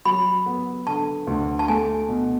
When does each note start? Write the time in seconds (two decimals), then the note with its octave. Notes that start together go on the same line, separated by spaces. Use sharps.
0.05 F#3 B5
0.46 B3
0.87 D3 A5
1.27 D2
1.59 A5
1.68 A3 G#5
2.09 B2